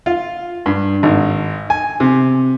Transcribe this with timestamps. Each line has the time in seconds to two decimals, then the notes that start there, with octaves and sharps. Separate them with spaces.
0.06 F4
0.66 G2
1.03 G#1
1.70 G#5
2.00 C3